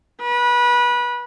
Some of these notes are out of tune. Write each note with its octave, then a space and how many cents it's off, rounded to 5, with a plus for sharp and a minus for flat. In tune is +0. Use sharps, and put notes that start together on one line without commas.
B4 -25